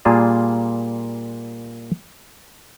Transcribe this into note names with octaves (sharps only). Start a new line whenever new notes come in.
A#2 G3 A#3 F4 G#4 A5